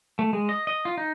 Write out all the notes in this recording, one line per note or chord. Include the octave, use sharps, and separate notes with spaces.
A3
G#3
D#5
D#5
F4
D#4